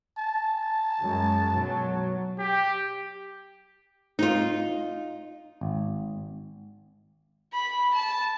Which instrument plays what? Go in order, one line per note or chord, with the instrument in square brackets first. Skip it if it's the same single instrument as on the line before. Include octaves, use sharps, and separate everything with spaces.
[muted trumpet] A5
[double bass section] F#2 G#3
B1 F#3
[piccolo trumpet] G4
[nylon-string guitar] D#4 F4
[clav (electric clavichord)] G#1
[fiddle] B5
A5